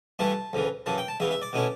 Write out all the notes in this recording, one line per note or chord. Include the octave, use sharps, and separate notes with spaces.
G2 E3 A3 E4 A5
D2 C#3 E3
F#2 C#3 E3 A5
G5
A5
E2 C#3 E3 E5
E5
D5
B2 A3 C#4 E4